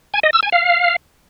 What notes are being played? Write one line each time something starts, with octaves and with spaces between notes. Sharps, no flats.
G#5
D#5
E6
G#5
F5